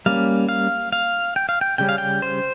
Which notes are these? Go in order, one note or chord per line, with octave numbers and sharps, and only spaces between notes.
G3 A#3 C#4 F5
F5
F5
G5
F5
G5
C#3 G3 C#4 G5
F5
G5
C5